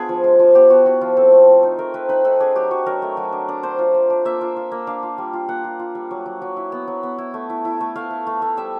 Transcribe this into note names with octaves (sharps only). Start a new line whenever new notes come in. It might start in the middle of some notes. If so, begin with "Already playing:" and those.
Already playing: B3 D4 F4 G#4
F3
G#3
F3
B3 G4
B3 F#4
E4 F#4
F3 F4
C4 A4
A3
C4
D#4
A3 A#4
C4 B4
D#4 B4
D#4 A4
D4 G#4
F#3 G4
F#3 F#4
F#3 A#4
A3
F#3
D4
D4
D4 C5
F4
D4
D4
A#3 E5
F4
F4
A#3
D4 F5
F4
G3
F4
A#3 F#5
F4
F4
G3
F#3
F#3
F#3
E4
B3
F#3
B3
E4
A3
E4
E4
A3
A3 F5
E4
A3
A3
G3 E5